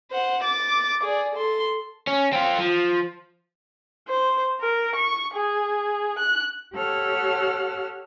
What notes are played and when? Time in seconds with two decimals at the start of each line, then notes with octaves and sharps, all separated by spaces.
0.12 C5 F#5
0.43 D6 A6
1.04 G#4 D5
1.35 A4 C6
2.07 C#4
2.33 C4 F4
2.58 F3
4.09 C5
4.61 A#4
4.96 C#6
5.34 G#4
6.19 F#6
6.74 G4 A4 C#5 F#5 E6 F6